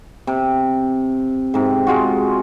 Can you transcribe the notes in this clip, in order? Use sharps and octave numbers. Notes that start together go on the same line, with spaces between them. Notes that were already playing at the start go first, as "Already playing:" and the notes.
C3
G#2 C3
G#3 F4 F#4